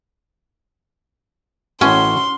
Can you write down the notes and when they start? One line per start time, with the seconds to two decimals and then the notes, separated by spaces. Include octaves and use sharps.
1.81 A1 A2 C#4 F#4 B4 C6